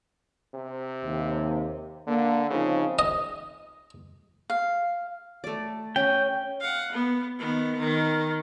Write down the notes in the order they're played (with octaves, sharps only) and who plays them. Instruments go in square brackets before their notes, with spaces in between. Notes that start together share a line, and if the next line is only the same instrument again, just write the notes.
[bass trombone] C3
[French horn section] D#2
[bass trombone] D3 [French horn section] A#3
[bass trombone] C#3 [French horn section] F3 C4 D#4
[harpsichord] D#5
[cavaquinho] F5
[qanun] A3 D5
[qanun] C#4 [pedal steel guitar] G5
[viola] F5 F#5
B3
D#3 B3
D#3